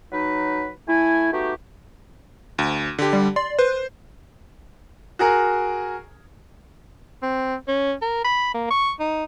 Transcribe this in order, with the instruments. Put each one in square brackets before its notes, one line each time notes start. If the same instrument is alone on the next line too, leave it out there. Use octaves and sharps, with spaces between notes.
[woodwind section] F#3 D#4 B4
A3 E4 G#5
A3 B3 D#4 F#4 G4
[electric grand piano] D2
D3 G4
[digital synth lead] G3
[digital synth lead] D5 [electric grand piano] C6
[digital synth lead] B4 [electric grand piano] C5
[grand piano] F#4 G#4 A#4
[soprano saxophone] C4
C#4
A#4
B5
A#3
C#6
D#4